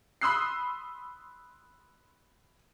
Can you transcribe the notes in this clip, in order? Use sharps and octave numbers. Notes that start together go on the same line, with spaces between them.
B5 C6 D#6 E6 F#6 C7